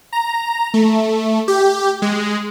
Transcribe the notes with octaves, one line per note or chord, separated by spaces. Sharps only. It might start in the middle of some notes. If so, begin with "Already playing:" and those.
A#5
A3
G4
G#3